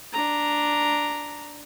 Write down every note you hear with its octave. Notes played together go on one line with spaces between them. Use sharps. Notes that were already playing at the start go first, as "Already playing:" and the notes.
D4 A#5